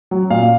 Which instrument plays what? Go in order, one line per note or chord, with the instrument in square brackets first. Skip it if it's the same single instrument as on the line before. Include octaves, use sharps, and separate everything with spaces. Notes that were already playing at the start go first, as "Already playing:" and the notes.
[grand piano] F#3
A#2 F5